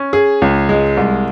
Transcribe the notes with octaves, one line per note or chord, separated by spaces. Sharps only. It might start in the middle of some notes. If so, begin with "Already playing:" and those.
Already playing: C#4
G#4
C#2
G#3
C2